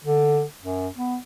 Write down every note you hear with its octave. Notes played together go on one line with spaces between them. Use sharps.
D3
F#2
B3